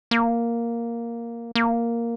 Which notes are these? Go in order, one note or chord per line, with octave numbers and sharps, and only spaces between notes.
A#3
A#3